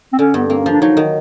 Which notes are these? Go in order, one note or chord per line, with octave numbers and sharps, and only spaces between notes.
C4
D3 C#4
G2 B3
A#3 C4
C#4
F3 D4
F#3 D#4
D#3